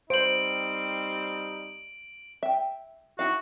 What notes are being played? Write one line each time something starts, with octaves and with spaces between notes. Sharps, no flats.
G3 C4 D#4 C5 D7 F#7
E5 G5
D#4 E4 F#4 F5